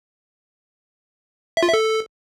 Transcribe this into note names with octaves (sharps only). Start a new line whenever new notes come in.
E5
F4
E5
A4